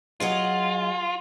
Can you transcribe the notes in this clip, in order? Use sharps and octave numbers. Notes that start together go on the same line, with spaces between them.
F#3 F4 G#4 D#5